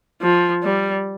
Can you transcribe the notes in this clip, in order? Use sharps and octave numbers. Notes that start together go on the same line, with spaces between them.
F3
G3